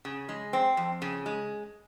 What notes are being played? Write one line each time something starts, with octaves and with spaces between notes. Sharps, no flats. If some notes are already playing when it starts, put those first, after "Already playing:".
C#3
G#3
C4
F2
C#3
G#3